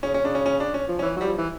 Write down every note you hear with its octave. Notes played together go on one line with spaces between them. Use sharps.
C#3 C#4
C#4
C#3 D4
C#4
C#4
D4
C#4
F3
C#4
E3
F#3 G3
F3
E3